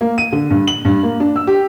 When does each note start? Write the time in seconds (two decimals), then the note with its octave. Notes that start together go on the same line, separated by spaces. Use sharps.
0.01 A#3
0.18 D#7
0.32 D3
0.50 G2
0.67 F#7
0.85 G2
1.03 A#3
1.20 D4
1.36 E6
1.47 G4